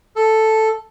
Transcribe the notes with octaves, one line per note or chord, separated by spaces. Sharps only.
A4